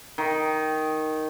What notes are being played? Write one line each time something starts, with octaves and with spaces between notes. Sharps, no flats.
D#3